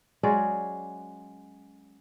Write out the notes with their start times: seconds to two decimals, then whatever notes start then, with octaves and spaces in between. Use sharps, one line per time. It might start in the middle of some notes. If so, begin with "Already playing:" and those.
0.23 F#3 G#3 C#4 D5